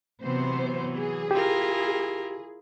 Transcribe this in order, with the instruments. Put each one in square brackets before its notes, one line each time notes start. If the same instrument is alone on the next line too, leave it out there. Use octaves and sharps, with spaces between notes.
[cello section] C3 B3 C5 [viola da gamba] E3 F#3
[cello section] G#4
[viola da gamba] E4 F4 A#4 [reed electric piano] G4